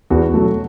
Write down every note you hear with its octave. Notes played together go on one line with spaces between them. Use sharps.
E2 F#4
B2 F#3 A3